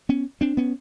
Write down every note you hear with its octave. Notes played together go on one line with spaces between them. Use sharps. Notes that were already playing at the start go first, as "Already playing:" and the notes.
B3 C#4
C4 D4
B3 C#4